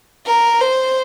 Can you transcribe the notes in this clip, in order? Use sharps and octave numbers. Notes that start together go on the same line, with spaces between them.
A#4
C5